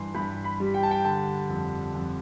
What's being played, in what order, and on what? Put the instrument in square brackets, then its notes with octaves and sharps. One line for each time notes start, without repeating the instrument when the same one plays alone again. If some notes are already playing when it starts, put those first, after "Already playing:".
Already playing: [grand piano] G2 E3 C6
G2 B5
B5
G3
G5
A5
G5
D3 A5
F2
F2